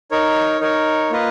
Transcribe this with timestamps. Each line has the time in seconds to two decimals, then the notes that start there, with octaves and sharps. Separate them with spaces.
0.11 D#4 A#4 C#5
0.60 D#4 A#4 C#5
1.10 A#3 F4 B4 D#5